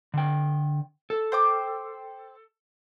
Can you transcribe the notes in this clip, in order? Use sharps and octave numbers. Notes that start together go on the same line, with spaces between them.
D3 G5
A4
C5 G5 D6